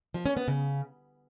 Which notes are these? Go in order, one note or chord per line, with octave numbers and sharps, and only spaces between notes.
F3
C#4
B3
C#3